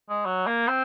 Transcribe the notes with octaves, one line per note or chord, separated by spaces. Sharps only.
G#3
F#3
A#3
C4